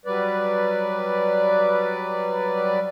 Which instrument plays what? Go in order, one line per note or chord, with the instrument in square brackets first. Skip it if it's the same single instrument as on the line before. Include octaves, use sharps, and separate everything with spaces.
[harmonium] F#3 G3 B4 D5